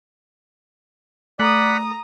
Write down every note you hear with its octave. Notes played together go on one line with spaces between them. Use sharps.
A3 D5 F#5 A#5 B5 D#6